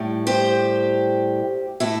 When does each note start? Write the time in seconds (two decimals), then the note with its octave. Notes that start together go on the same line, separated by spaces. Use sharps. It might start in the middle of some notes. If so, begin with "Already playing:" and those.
Already playing: A2 G3
0.27 G4 C5
1.80 A2 E4 A4